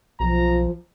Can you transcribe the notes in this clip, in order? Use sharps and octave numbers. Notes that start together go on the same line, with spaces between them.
B1 F3 A#5